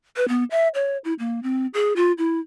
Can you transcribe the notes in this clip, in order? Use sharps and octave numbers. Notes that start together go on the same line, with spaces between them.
B4
B3
E5
C#5
E4
A#3
C4
G#4
F4
E4